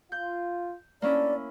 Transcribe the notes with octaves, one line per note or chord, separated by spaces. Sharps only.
F4 G6
A#3 C#4 D4 E4 D5